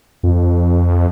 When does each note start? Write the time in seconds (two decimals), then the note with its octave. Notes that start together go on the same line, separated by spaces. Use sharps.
0.23 F2